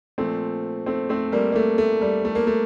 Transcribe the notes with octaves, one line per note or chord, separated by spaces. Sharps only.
A#2 F3 A3 C4
A3 C4
A3 C4
G3 A#3
A#3
A3
A3
G3
A3
A#3
A3